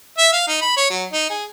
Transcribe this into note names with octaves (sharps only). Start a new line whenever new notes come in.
E5
F5
D#4
B5
C#5
F#3
D#4
G#4